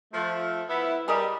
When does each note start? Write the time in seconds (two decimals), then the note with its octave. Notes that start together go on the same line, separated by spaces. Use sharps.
0.14 F3 A3
0.68 B3 E4
1.08 G3 G#4 A#4 D#5